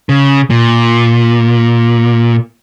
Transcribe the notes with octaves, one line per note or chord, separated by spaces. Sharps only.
C#3
A#2